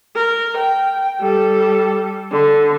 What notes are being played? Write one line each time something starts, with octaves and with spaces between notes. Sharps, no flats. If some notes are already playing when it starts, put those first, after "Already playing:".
A#4
G5
G3 A4
D3